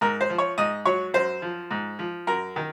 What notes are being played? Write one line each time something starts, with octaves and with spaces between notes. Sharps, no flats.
G#2 A#4
C5
F3
C#5
G#2 D#5
F#3 C#5
F#2 C5
F3
G#2
F3
F#2 A#4
D#3